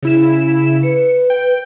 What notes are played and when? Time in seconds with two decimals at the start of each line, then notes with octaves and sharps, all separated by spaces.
0.03 C#3 E4 E7
0.83 B4 C#7
1.30 G5